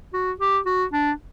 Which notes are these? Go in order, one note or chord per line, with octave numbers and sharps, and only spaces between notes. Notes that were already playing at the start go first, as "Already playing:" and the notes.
F#4
G4
F#4
D4